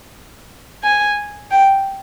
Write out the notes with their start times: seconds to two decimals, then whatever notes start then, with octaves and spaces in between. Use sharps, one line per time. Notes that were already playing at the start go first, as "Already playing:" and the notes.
0.83 G#5
1.51 G5